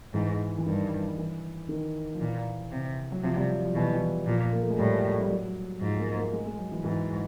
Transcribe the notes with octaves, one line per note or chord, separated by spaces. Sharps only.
G#2 E3
E3
G2 D#3
E3
D#3
F3
A#2 E3
C3
F#3
C3 F3
G3
F#3
F3
B2 E3
E3
A#2 F3
A#3
A3
G#3
A2 G3
G3
F#3
G#2 F3
A#3
A#3
G#3
G#3
F#3
E3
G#2 E3